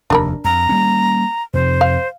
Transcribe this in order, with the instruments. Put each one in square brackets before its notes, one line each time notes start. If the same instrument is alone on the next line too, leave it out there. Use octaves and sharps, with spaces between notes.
[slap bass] F1 D#2 [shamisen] D4 A#4 B5
[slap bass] F2 [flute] A#5
[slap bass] G3 A#3 C#4
[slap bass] F2 C3 [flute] C5
[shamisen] F5